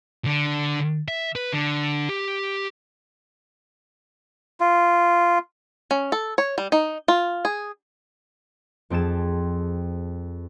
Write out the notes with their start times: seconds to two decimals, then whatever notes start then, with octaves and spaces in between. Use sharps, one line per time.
0.25 D3
1.08 E5
1.36 B4
1.53 D3
2.09 G4
4.60 F4
5.91 C#4
6.12 A4
6.38 C#5
6.58 G3
6.72 D#4
7.08 F4
7.45 G#4
8.90 F2 C4 G#4 A5 E7